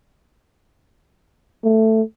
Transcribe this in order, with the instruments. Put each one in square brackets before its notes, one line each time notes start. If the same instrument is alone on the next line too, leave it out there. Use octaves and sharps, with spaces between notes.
[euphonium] A3